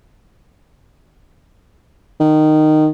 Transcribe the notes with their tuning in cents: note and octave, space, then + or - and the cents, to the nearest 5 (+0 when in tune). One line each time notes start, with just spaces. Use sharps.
D#3 -15